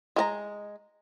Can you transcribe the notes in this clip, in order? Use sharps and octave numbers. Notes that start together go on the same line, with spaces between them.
G#3 A#4 A#5